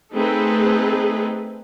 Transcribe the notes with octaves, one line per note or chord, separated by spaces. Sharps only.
A3 C4 D#4 G#4 A4 B4